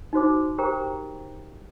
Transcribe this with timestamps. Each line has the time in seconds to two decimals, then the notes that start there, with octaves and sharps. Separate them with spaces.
0.13 D#4 F#4 C5 D6
0.58 G4 A#4 C5 G5 A#5